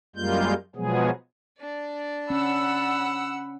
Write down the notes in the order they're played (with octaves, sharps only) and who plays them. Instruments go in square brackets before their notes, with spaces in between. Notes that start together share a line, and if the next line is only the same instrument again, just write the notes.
[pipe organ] F#2 G3 G#3 A#3 F4 G6
B2 F3 F#3 G#3 B3 G#4
[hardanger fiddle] D4 D5
[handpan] C#4 [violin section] F#5 E6 [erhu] B5